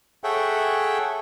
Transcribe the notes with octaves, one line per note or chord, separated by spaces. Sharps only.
G#4 A4 C#5 E5 F#5 G5